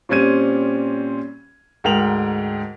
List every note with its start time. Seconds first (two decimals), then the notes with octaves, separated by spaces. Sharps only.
0.09 A#2 G3 C4 C#4 G#6 D#7
1.84 D2 G#2 A#4 G5 F7 F#7